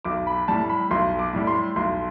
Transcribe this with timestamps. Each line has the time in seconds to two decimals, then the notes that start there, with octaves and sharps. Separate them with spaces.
0.05 B1 D6
0.27 B5
0.48 A2 G3 A5
0.69 B5
0.91 B1 C6
1.19 D6
1.33 A2 G3
1.47 C6
1.76 B1 C6